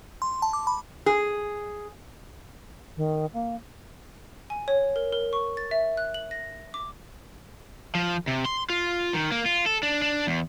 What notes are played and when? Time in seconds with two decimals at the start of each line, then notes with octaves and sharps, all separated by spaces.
0.22 C6
0.42 A5
0.53 D6
0.67 B5
1.06 G#4
2.97 D#3
3.34 A#3
4.50 G#5
4.68 C#5
4.96 A#4
5.12 A#4
5.33 C#6
5.57 A6
5.71 E5
5.97 F#6
6.14 F#7
6.31 A#6
6.74 D6
7.95 F3
8.28 C3
8.45 C6
8.70 F4
9.14 D#3
9.32 A#3
9.46 F4
9.66 A4
9.83 D4
10.02 D4
10.27 E2